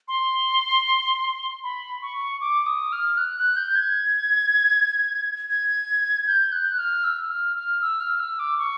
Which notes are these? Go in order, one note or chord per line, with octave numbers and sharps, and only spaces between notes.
C6
B5
C#6
D6
D#6
F6
F#6
F#6
G6
G#6
G#6
G6
F#6
F6
E6
F6
F6
E6
F6
E6
D6
C#6